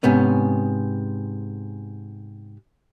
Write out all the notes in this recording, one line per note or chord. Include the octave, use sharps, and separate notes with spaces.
G#2 C3 B3 C#4